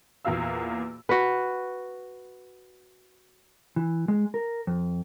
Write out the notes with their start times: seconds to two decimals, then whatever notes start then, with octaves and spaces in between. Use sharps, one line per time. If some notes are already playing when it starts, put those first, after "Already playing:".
0.25 E2 A#2 A#3 F#4 F5 E6
1.09 F#4 B4
3.76 E3
4.08 G#3
4.34 A#4
4.67 F2